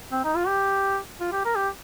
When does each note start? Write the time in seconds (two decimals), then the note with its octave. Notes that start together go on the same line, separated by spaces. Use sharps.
0.12 C4
0.24 D#4
0.36 F4
0.47 G4
1.20 F4
1.32 G4
1.45 A#4
1.56 G4